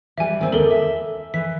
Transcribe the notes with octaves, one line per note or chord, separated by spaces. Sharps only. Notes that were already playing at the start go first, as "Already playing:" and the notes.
E3 G3 E5 G#5
D#3 C4
D#2 D3 A4 A#4
E5
E3 B6